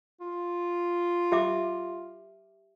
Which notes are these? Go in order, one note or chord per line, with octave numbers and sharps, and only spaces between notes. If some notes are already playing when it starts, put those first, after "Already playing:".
F4
G4 E5 D6